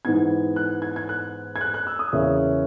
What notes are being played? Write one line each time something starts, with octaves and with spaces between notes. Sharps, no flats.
G#2 E3 B3 D#4 G#6
F#6
G#6
G#6
F#6
G#6
F#6
F#6
E6
D#6
E2 C#3 E3 A#3 C#4 E5